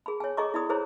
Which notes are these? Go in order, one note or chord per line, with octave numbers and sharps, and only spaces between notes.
G#4 B5
C#5 G#5
G#4 A4 D#5 A#5 C#6 D6
E4 D5 B5 D#6
E4 G#4 A4 C5 C#5 A#5